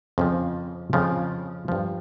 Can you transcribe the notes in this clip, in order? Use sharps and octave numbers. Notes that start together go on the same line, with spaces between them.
F2 C#3 F3
F2 C#3 F3
G2 F3